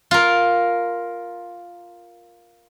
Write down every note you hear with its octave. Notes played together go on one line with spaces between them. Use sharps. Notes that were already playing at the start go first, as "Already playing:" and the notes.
F4 A#4